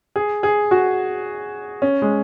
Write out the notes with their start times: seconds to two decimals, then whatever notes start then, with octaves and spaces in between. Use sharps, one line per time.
0.16 G#4
0.43 G#4
0.71 F#4
1.82 C#4
2.02 G#3